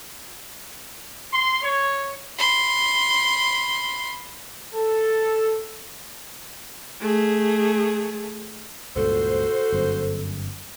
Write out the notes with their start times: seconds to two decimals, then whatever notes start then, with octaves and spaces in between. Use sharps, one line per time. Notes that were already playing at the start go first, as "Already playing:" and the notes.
1.32 C6
1.63 C#5
2.38 B5 C6
4.74 A4
7.01 A3 G#4
8.96 C#2 G2 A#2 F#4 A4 C5
9.73 G1 F#2